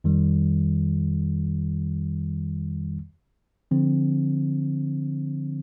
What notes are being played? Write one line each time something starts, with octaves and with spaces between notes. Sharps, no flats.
F2 D#3 G3
D3 F3 C4